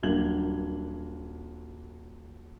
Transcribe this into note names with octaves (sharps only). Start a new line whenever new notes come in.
D#1 F#3 A#3 D4 G#6 F#7